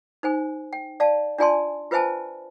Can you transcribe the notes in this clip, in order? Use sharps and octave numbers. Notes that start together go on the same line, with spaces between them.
D#4 C5 G#5
G5
D5 F5 A5
D4 F4 D5 G#5 A5 C6
F4 B4 C5 E5 G#5 A5